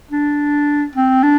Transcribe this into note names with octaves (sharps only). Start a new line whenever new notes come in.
D4
C4
D4